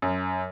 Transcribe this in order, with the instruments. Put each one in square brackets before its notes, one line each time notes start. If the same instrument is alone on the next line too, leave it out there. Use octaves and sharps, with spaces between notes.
[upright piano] F#2